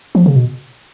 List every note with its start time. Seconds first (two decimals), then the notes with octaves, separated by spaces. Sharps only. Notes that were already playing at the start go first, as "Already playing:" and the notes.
0.15 F3
0.26 C#3
0.36 B2